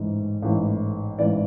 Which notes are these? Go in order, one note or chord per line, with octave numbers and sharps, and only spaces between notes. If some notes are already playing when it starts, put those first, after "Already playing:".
Already playing: A1 G#2 E3
A1 G#2 E3
A1 G#2 E3 D5